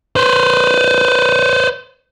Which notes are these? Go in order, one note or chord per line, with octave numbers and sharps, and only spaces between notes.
B4 C5